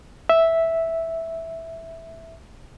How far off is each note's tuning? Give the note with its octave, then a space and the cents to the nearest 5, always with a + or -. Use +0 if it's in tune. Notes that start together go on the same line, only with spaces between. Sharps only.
E5 -5